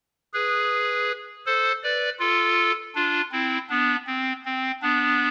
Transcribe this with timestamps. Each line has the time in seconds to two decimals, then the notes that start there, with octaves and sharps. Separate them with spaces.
0.33 G#4 B4
1.46 A4 C5
1.83 B4 D5
2.20 F4 A4
2.95 D4 F4
3.32 C4 E4
3.69 B3 D4
4.07 C4
4.45 C4
4.82 B3 D4